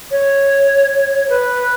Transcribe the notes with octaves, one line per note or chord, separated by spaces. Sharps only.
C#5
B4